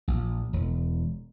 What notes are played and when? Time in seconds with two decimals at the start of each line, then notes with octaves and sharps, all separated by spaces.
0.08 A#1
0.53 E1